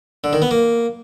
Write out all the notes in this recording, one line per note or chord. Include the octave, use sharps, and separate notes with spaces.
D3
D#3
B3
A#3